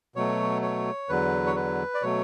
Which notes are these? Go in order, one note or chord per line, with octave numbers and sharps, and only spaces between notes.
B2 F#3 A3 C#5
C#5
E2 D3 F#3 B4
C#5
B4
D5
B2 F#3 A3 C#5